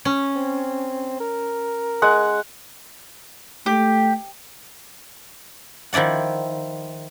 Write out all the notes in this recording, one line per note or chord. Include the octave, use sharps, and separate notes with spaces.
C#4
C4
A#4
G#3 F#5
A3 G4
D#3 F3 E4 D5 F#5